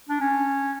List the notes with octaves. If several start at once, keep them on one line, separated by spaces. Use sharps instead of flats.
D4
C#4